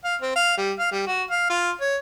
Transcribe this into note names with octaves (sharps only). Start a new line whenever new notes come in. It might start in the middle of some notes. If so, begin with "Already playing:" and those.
F5
C4
F5
G3
F5
G3
F#4
F5
F4
C#5